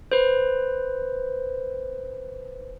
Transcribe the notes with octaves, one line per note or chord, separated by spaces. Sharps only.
B4 C5